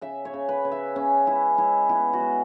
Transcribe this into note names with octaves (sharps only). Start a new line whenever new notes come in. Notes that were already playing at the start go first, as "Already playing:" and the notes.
C#3 E5
C#5
C#3
B4
C#3
E5
C#3 C#4
G#3 E4
G#3 E4
B3 E4
F#4
G#3